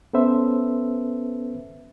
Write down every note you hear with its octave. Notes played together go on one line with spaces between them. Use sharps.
B3 C#4 A4 B4 C5 E5